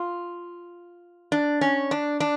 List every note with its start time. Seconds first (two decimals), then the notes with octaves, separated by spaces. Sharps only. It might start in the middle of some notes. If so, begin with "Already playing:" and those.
Already playing: F4
1.32 D4
1.61 C#4
1.91 D4
2.20 D4